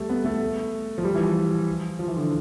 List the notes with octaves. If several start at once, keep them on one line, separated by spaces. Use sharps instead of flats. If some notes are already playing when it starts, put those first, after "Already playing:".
Already playing: G3 A3
B3
A3
F3
G3
E3
F3
F3
E3
D3